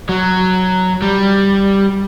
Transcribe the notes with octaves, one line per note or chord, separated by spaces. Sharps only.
F#3
G3